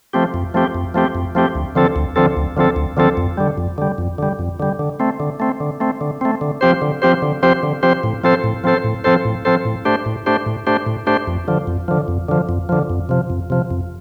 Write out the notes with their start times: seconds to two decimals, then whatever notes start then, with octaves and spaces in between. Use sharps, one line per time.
0.13 F3 A3 C4 G4
0.34 F2
0.54 F3 A3 C4 G4
0.75 F2
0.94 F3 A3 C4 G4
1.15 F2
1.35 F3 A3 C4 G4
1.55 D2
1.75 D3 F3 C4 A4
1.96 D2
2.16 D3 F3 C4 A4
2.37 D2
2.56 D3 F3 C4 A4
2.76 D2
2.97 D3 F3 C4 A4
3.17 F2
3.37 D3 G3
3.58 F2
3.78 D3 G3
3.98 F2
4.18 D3 G3
4.39 F2
4.60 D3 G3
4.79 D3
5.00 A3 C4
5.20 D3
5.40 A3 C4
5.60 D3
5.80 A3 C4
6.01 D3
6.21 A3 C4
6.41 D3
6.61 F3 C4 G4 C5
6.82 D3
7.02 F3 C4 G4 C5
7.22 D3
7.43 F3 C4 G4 C5
7.63 D3
7.83 F3 C4 G4 C5
8.03 A2
8.24 F3 C4 A4 C5
8.44 A2
8.64 F3 C4 A4 C5
8.84 A2
9.04 F3 C4 A4 C5
9.25 A2
9.45 F3 C4 A4 C5
9.65 A2
9.85 A3 D4 G4 C5
10.06 A2
10.26 A3 D4 G4 C5
10.46 A2
10.67 A3 D4 G4 C5
10.86 A2
11.07 A3 D4 G4 C5
11.27 F2
11.48 D3 F3
11.67 F2
11.88 D3 F3
12.08 F2
12.29 D3 F3
12.49 F2
12.69 D3 F3
12.90 F2
13.09 C3 F3
13.30 F2
13.50 C3 F3
13.71 F2